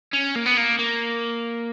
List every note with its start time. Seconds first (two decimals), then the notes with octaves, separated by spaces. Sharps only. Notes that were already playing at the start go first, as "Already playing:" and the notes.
0.13 C#4
0.35 A#3
0.46 B3
0.57 A#3
0.79 A#3